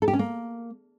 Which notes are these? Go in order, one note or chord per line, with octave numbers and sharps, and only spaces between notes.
A4
G4
C#4
A#3